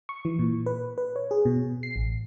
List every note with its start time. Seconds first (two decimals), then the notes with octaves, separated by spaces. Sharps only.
0.09 C#6
0.25 E3
0.39 A#2
0.66 B4
0.98 B4
1.16 C#5
1.31 G#4
1.45 B2
1.83 C7
1.96 A1